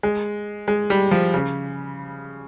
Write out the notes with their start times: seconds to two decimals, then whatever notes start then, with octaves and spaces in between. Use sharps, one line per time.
0.03 G#3
0.68 G#3
0.90 G3
1.11 F3
1.34 C#3